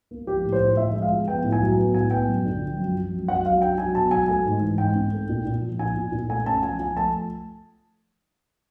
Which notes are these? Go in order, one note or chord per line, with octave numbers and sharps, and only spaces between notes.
A#3
F3 G4
A2
C5
A2
F3 E5
G#3
F5
F3
B3 G5
A2
G#5
F#3
B3
A2 G#5
B3 G5
F#2
D3
F3
F#2
F3
F#2
F#3 F#5
F#3 F5
D4 G5
F#3 G#5
B2 A5
F#3 G#5
A3 G#5
G#2
E3
G#2 G5
C4
A3
A#2
A#2
F3
A#2 G#5
A#2
A#2
A3 G#5
C#4 A5
F3 G#5
F3 G#5
A3 A5